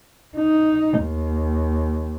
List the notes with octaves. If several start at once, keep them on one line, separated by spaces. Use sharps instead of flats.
D#4
D#2